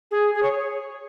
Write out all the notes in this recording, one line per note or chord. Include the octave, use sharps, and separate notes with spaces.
G#4
G#4
C#5